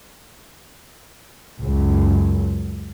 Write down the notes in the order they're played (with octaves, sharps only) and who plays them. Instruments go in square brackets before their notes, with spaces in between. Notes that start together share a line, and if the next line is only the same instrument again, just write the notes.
[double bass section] C#2 F#2